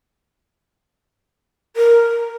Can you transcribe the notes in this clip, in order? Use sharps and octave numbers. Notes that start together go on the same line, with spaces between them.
A#4